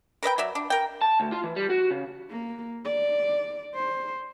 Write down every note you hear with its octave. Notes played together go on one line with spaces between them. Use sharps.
A#4 B4 D#5 G5
F#3 D5 E5
D4
A#4 G5
A5
D2
F4
E3
G3
F#4
C#3
A#3
D5
C5